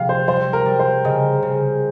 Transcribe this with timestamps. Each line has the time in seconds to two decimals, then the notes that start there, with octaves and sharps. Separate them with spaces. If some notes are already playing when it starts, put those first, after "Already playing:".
Already playing: C3 F3 F5
0.09 C5
0.27 G3 C5
0.53 A#4
0.66 G3
0.79 C5
1.05 C#3 D#5
1.43 C#3